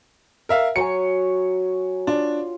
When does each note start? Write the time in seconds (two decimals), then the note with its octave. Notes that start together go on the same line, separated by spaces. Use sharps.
0.49 A#4 E5 F5
0.76 F#3 C#5 G#5 C#7
2.07 D4 F4